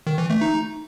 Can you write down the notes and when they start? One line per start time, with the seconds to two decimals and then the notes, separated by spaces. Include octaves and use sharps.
0.07 D#3
0.18 E3
0.30 A3
0.41 D#4